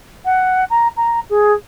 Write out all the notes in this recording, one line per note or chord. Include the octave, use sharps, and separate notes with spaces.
F#5
A#5
A#5
G#4